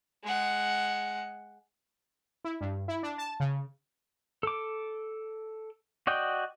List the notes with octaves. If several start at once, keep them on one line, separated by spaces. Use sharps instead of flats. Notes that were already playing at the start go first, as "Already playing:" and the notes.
G#3 F#5
E4
G2
E4
D4
A5
C#3
A4 D6
F#4 D5 D#5 G5